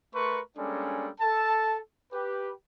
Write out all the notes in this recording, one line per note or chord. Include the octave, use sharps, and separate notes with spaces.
A3 A#4 B4 C6 C#6
G3 G#3 A#3 C#4 D4 A4
A4 A5
G4 B4